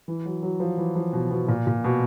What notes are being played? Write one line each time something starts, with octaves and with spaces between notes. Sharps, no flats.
E3
F#3
F#3
F3
E3
F3
B2
B2
A#2
A#2
B2